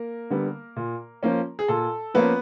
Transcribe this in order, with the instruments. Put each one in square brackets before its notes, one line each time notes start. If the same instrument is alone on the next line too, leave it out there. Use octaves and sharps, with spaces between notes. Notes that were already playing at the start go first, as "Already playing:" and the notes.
Already playing: [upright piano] A#3 A#4
D3 G3 B3
A#2
F3 A#3 C#4
G#4
A#2 A4
F3 A#3 B3 C#4 B4